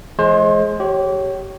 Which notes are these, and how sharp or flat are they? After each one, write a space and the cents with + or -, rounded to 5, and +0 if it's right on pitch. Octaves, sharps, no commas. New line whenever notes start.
E3 +5 G#3 +20 C5 +35
G4 -30 C#5 +0